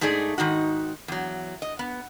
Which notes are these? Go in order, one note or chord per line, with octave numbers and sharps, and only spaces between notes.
G#2 A3 D#4 G#4 D5
G#2 D#3 D#4 F#4
E2 F#3
D#5
B3